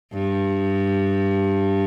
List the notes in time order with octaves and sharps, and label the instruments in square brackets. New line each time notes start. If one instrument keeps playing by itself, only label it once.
[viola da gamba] G2